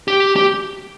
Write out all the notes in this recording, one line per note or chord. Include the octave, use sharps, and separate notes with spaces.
G4
G4